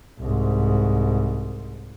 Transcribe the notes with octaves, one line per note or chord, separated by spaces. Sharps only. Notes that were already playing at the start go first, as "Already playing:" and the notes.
C2 G#2